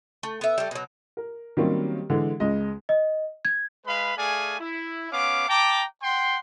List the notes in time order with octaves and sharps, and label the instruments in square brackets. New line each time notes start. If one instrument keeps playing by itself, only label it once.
[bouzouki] A3
B3 E5
G3 A3
B2 F#3
[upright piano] A#4
D#3 F#3 G3 A#3 C4 C#4
D3 E3 G#3
C#2 C#3 G#3 D#5
[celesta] D#5
G#6
[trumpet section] G#3 B4 F5 B5
A3 G#4 D5 F5 G#5
E4
B3 C#4 F5 D6
G5 A5 A#5 D6
F#5 G5 C6